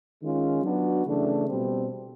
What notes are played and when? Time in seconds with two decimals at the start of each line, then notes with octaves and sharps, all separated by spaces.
0.21 D#3 G#3 C#4 F4
0.63 F#3 B3 D4 F#4
1.05 C#3 E3 A3 D4
1.47 B2 G3 C4